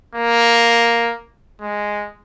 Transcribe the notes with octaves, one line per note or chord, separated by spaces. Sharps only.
A#3
G#3